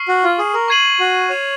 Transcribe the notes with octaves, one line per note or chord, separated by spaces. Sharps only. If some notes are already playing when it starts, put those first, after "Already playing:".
Already playing: C#6 F6 C7 F#7
F#4
F4
G#4
A#4
C#6 G#6 C7 D#7 F#7
F#4
C#5